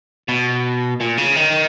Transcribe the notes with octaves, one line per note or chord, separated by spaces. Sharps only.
B2
A#2
C#3
D#3